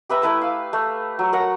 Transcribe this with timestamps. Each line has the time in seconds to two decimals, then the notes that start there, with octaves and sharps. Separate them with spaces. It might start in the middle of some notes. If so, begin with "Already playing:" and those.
0.09 G4 B4 E5 A#5
0.22 A3 E4 B4 A5
0.41 F5
0.73 A3
1.19 F#3
1.33 A#4 C#5 F#5 A#5